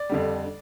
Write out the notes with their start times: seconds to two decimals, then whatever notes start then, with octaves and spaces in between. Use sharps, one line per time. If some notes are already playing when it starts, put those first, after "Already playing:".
Already playing: D5
0.09 F2 D3 G3